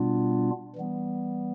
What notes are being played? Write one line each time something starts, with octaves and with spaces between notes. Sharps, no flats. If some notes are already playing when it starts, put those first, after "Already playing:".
Already playing: B2 G3 B3 D4 F4
E3 G3 B3